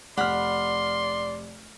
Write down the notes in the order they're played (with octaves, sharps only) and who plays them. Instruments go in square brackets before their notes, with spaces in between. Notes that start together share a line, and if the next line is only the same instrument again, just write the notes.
[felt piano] F1 F6 [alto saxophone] D5 [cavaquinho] F#5 B5 [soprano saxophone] C6